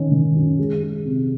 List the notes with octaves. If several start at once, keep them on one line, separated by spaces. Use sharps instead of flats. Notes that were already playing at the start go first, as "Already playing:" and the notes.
Already playing: D#3 C#4
D#3
F#2
G#3
G#3
C3